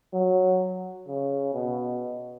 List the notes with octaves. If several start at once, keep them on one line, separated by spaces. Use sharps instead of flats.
F#3
C#3
B2